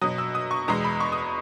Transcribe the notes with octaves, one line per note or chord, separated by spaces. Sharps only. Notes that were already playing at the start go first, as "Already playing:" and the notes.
B2 F#3 D#6
E6
D#6
C#6
E2 B2 G#3 A#5
B5
C#6
D#6